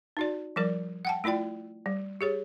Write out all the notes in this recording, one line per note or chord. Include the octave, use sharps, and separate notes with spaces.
D#4 F#4 D5
F3 G3 A#4 D5
F#5 G5 A5
A3 E4 F4 D5 G5
G3
G4 G#4 C#5